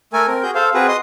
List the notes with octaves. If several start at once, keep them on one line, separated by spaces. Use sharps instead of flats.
A3 A4 A#4 G#5
C4 A#4
F#4 G#4 G6
A4 C5 F5
C4 F#4 G#4 B4
D#5 C6 D#6